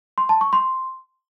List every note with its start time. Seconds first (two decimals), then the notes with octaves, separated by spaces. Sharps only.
0.18 C6
0.29 A5
0.41 C#6
0.53 C6